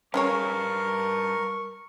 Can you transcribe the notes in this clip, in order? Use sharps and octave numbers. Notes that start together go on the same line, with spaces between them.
G3 C#4 G#4 A#4 B4 C#5 F5 C#6